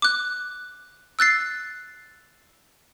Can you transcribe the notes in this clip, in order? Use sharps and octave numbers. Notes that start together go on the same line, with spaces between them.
D6 F#6
E6 F#6 A6 C7